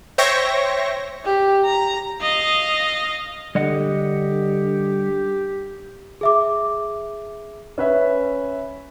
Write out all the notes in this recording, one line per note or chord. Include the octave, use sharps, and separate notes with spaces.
C5 C#5 E5 G5 C#6 A#6
G4
A#5
D#5 F5
D3 G3 G4 D#5 F#5
G#4 E5 D6
C#4 B4 E5